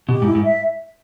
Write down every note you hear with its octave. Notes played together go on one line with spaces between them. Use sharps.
B2 G4
G#2
E4
G#2
E5